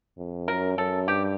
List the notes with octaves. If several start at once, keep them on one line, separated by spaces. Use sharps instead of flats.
F2
F#2 A#4
F#2 A4
G2 G4